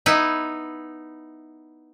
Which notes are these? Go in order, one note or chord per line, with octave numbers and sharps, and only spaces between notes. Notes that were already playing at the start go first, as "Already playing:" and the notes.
B3 D#4 E4